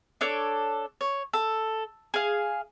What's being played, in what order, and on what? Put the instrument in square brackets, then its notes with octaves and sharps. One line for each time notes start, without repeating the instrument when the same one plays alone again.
[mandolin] D4 A4 C#5 D6
C#5
A4
G#4 F5